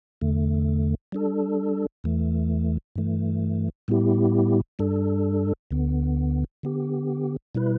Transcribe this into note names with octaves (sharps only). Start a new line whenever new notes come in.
E2 D3 A3
G3 D4 A4
E2 E3 A3
G2 E3 A3
A2 G3 B3 E4 G4
G2 G3 D4 A4
D2 D3 B3
D3 B3 G4
B2 G3 E4 B4